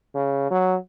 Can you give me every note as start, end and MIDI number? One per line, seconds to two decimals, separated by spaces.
0.15 0.49 49
0.50 0.76 54